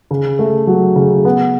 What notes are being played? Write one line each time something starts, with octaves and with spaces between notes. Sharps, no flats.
C#3
A3
F#3
C#3
B3